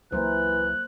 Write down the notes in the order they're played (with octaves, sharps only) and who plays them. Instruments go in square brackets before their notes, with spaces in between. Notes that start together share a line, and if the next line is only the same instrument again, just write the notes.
[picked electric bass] C#2 F#3 [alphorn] E3 [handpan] A#3 A#4 C5 [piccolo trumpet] F#6